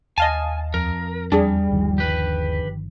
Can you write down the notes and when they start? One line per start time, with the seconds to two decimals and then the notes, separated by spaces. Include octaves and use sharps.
0.18 D#2 D#5 F5 G#5 A5
0.74 F2 A#4
1.32 E2 G3 D4 G#4
1.71 G1 D#2 D#3 F3
1.98 G4 B4